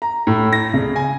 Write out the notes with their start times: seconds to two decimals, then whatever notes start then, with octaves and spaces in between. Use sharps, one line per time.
0.02 A#5
0.27 A2
0.53 A#6
0.74 C#3
0.96 G#5